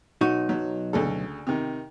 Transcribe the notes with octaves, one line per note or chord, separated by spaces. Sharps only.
B1 D#4 F#4
F#3
D2 C#3 A4
C3 D#3